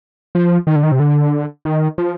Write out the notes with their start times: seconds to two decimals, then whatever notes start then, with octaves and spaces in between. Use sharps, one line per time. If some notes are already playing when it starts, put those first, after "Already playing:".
0.35 F3
0.67 D#3
0.76 D3
0.83 D#3
0.92 C3
1.00 D3
1.65 D#3
1.98 F3